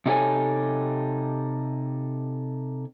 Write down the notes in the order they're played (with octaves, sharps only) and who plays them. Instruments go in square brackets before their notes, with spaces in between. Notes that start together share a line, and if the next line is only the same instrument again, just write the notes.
[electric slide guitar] C3 D#4 G4 A4 C#5 G#5